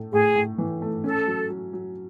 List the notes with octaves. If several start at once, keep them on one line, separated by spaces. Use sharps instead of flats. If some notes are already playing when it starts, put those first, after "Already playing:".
Already playing: A2 A3
A2 G#4
A2
E3
A3
C#4 A4
F#3
F#3
F#3